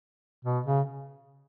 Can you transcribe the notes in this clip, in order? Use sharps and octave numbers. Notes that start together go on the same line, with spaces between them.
B2
C#3